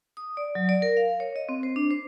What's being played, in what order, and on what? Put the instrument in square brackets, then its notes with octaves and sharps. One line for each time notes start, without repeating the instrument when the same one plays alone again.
[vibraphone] D#6
D5
F#3
D5
A#4
F5
C#5
D#5
C4
C5
D4
C5